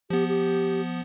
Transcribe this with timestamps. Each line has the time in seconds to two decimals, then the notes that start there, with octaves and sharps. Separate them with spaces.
0.10 F3 B3 G4
0.28 G4